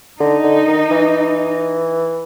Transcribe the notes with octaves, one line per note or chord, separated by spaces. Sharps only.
D3 D#4
D3
D#3
E3